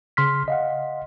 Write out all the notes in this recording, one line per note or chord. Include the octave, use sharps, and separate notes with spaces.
C#3 C6 F6 B6
D#5 F5 F#5